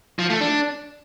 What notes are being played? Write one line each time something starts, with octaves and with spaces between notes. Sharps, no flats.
F3
A3
D4